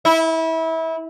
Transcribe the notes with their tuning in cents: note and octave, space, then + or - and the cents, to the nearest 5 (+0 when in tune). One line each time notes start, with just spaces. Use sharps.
E4 -25